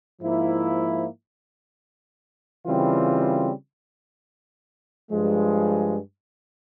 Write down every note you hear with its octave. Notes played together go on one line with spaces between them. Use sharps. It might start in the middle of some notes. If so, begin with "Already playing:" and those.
G#2 F3 A#3 E4
C#3 E3 G3 C4 F4
G2 F3 G#3